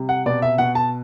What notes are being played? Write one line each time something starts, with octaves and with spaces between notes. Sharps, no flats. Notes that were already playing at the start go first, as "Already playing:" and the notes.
Already playing: C3 G3
F#5
B2 D5
E5
B2 F#5
A5